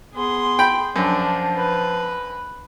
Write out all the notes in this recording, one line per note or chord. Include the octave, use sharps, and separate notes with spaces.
B3 G#4 C6
G5 B5
F#2 F3 D4
B4